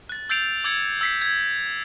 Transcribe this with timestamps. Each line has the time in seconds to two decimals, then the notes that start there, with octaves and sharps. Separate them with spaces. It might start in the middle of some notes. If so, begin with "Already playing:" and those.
0.09 F#6 A6
0.29 E6 G6 A6 C7 D7 F7
0.64 D6 E6 G#6 A6 C#7
1.01 E6 B6 C7
1.22 G#6